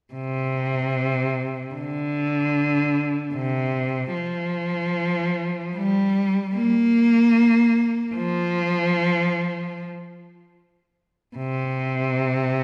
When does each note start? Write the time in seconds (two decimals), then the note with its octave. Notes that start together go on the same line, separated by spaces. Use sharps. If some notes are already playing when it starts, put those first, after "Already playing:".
0.14 C3
1.74 D3
3.34 C3
4.15 F3
5.76 G3
6.55 A#3
8.15 F3
11.36 C3